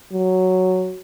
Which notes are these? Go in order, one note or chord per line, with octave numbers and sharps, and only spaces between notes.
F#3